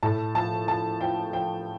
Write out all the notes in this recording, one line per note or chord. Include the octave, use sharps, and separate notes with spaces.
A2 A5
F3 A5
F3 A5
F3 G5
F3 G5